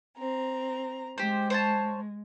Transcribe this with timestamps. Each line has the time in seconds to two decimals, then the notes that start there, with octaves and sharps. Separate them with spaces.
0.17 C4 A#5
1.18 G#3 G4 C5
1.50 C5 C#5 A5